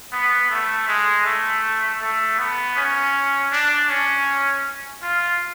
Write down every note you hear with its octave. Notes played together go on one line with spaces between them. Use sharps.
B3
A3
G#3
A3
A3
B3
C#4
D4
C#4
F4